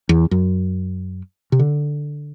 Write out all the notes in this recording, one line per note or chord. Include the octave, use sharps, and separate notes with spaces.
E2
F#2
C3
D3